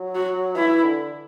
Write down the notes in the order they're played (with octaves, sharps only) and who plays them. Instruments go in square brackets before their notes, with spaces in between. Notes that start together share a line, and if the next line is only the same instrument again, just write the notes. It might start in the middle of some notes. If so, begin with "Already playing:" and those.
Already playing: [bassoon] F#3
[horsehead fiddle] F#4
[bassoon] E3 [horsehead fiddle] E4
[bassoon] D3